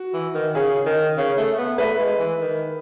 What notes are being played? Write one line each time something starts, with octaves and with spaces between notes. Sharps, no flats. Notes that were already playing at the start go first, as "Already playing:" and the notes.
Already playing: F#4
E3
D#3
C#3 G#4
D#3
C#3
A3
B3
A3 B4
G#3
E3
D#3